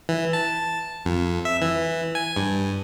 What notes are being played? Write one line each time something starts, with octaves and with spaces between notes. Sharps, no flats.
E3
A5
F2
E5
E3
G#5
G2